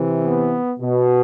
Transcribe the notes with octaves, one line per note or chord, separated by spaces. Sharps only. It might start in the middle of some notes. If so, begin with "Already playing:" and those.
Already playing: C3 E3
B3
B2